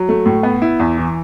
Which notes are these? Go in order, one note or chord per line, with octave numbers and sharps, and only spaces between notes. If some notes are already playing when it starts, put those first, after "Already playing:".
Already playing: F#3
A3
A2
B3
E4
E2
E3